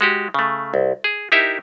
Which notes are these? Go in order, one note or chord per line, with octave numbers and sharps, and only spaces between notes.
G#3 F#4 G4
C#3 A3
C2
G#4
D#4 E4 G4 A#4 E5